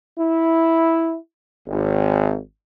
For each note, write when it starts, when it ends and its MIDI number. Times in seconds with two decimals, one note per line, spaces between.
0.19 1.17 64
1.67 2.38 32